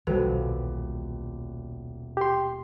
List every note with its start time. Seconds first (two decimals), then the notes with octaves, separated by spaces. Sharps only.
0.07 D#1 B1 B2 E3 G3 F#4 A4 B4
2.17 G4 C6